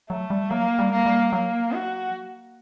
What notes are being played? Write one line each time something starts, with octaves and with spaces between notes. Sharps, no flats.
F#3 A3
G3
F#3 A#3
G3
A#3
G3
F#3 A#3
F#4